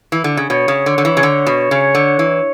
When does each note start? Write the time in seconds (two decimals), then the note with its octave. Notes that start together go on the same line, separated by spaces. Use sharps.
0.12 E3
0.24 D3
0.37 C#3
0.50 B2 C#5
0.68 C#3
0.86 D3
0.98 D3
1.05 E3
1.17 C#3
1.23 D3
1.47 B2
1.71 C#3
1.95 D3
2.19 E3